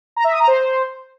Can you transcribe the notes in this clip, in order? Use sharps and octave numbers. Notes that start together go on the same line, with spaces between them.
A#5
E5
D#6
A#5
C5